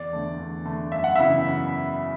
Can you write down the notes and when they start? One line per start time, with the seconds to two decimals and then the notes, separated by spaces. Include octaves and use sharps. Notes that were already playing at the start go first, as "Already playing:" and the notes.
Already playing: E2 D5
0.13 D3 A3
0.38 E2
0.65 D3 A3
0.92 F#2 E5
1.04 F#5
1.16 C#3 E3 B3 E4 E5
1.46 F#2